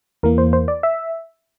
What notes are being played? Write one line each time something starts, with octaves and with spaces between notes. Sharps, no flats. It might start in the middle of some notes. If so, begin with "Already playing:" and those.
E2 E3 A#3 A#4
C5
C5
D5
E5